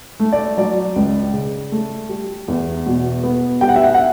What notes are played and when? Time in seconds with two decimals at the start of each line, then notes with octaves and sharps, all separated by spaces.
0.20 A3
0.32 D5
0.57 F#3 D5
0.96 C#2
1.34 C#3
1.72 A3
2.09 G3
2.48 E2
2.86 B2
3.23 B3
3.61 G3 G5
3.69 F#5
3.76 E5
3.83 F#5
3.94 F#5